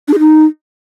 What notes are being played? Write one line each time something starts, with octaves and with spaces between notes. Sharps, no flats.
D4
G#4
D#4